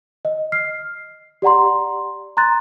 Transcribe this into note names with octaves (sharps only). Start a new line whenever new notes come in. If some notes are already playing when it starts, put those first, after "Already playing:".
D#5
F6 C7
G4 D5 F#5 A#5 C6
A#5 C6 F#6 A6